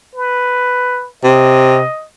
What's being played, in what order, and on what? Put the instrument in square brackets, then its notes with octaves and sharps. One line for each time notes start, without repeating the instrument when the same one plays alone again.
[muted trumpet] B4
[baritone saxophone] C3 [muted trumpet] D#5